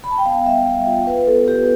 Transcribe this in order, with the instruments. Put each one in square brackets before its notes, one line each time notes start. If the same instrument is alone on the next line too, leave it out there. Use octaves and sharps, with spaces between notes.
[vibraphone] B5
A5
G5
B3 F5
G3 E5
G3
F4
F4 B4
B3 A4
F4 G4